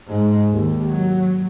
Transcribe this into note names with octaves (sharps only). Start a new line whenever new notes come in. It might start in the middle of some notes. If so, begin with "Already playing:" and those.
G#2
D#2
F#3